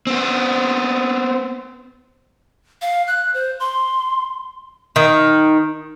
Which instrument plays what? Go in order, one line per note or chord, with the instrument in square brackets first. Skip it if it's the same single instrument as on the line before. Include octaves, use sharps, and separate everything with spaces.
[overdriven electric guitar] B3 C4
[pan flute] F5
F#6
C5
C6
[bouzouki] D#3